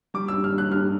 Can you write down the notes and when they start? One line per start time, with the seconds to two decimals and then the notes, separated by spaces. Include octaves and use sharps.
0.14 G3 D6
0.28 E6
0.34 G2
0.44 F6
0.52 G3
0.58 F#6
0.71 G2 F6